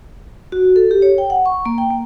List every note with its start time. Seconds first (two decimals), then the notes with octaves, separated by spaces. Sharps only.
0.52 F#4
0.76 A4
0.91 G4
1.02 C#5
1.18 G5
1.30 F#5
1.46 C#6
1.66 A#3
1.78 G5
1.90 A#3